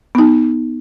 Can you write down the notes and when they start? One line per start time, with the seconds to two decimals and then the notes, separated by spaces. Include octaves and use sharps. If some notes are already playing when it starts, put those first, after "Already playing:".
0.15 B3 D#4